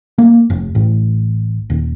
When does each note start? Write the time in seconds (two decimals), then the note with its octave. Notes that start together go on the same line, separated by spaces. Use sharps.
0.18 A#3
0.50 F1
0.75 A1
1.70 D#1